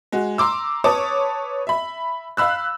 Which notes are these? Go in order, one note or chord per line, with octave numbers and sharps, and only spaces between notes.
G#3 F#4
A#5 C6 D6 E6
B4 C#5 A5 D6 D#6
E5 B5
F5 B5 E6 F#6